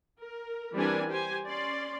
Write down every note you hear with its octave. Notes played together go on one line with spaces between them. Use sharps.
A#4
E3 G3 C4 D4 A#4 G#5
G4 C5 G#5
C#4 D5 C6